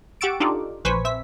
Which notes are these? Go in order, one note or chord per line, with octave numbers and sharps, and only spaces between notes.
G4 F#5 C#6 E6 A6 D7
D4 D#4 F4 G4 A4 D5
A#1 B4 C5 G#5 C#6 B6
C4 E5 B6